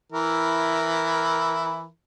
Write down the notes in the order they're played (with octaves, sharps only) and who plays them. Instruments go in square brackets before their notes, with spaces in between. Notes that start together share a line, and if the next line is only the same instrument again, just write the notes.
[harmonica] E3 E4 A#4